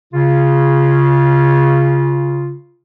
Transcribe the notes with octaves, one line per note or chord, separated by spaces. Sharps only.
C#3 F4